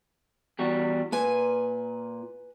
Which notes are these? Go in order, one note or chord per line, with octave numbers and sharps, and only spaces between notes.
E2 G3 F#4
A#2 B4 G#5